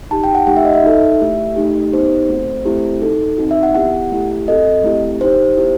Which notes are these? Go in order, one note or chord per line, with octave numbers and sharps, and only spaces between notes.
D#4 G4 A5
G5
F#5
A3 D#4 G4 F#5
E5
D#5
E5
D#4 F#4 A4
A3 E4 G4
A3 D#4 G4
B3 D#4 G4 C5
A3 C4 F#4
A3 C4 E4 G4
D#4 F#4 A4
C4 D#4 F#4
E5
F#5
B3 E4 G4 F#5
A3 E4 G4
C4 F#4 A4 D#5
A3 C4 E4 G4
D#4 G4 C5
B3 E4 G4